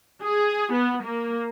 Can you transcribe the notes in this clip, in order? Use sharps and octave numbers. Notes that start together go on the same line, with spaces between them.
G#4
B3
A#3